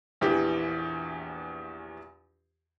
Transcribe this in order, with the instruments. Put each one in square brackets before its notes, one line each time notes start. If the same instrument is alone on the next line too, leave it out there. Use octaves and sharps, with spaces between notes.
[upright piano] A#1 E2 E3 G4